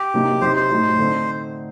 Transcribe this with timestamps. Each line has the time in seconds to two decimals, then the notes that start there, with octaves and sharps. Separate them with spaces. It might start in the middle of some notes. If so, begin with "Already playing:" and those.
Already playing: G4
0.14 C3 F#3 A#3 D#4
0.41 C3 F#3 C4 D#4 C5
0.56 C5
0.70 A2 F#3 A3 D#4
0.98 D3 A3 C4 D#4